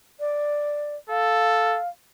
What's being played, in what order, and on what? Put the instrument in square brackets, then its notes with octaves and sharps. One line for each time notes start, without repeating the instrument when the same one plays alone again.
[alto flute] D5
[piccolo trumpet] A4 [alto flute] F5